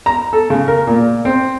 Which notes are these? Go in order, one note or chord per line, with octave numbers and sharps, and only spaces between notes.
A#5
A4
C#3
A#4
A#2
C4